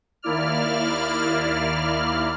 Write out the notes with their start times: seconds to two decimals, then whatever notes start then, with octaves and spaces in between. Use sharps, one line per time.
0.22 D#2 A#3 E4 D5 F6